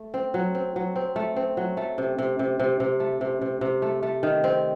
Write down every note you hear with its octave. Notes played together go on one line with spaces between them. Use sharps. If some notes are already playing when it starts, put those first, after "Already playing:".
Already playing: A3
C4
F#3
C4
F#3
C4
A3
C4
F#3
A3
C3
C3
C3
C3
C3
A3
C3
C3
C3
A3
A3
D#3
C4